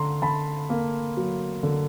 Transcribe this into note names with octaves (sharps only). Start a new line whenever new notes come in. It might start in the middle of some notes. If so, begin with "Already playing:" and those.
Already playing: D3 A#5 C6
D3 A5 B5
A#3
F#3
D3